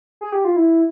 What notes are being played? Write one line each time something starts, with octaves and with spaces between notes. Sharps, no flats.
G#4
G4
F4
E4